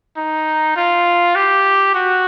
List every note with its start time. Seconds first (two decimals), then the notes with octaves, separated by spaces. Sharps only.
0.17 D#4
0.76 F4
1.36 G4
1.95 F#4